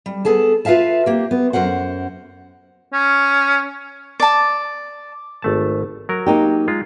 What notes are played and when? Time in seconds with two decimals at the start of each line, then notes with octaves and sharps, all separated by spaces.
0.06 G3
0.25 B3 G#4 A4 A5
0.65 F4 B4 E5 F5 A5
1.06 A#3 G4
1.31 B3
1.53 F#2 A#4 C5 F#5
2.93 C#4
4.20 D5 A5
5.42 G#1 A3 A5
6.09 F#3 A#4
6.26 A#3 D#4 G4
6.68 G#3 F4